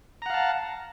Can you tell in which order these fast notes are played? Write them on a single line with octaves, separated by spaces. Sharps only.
A#5 F#5 F5 A5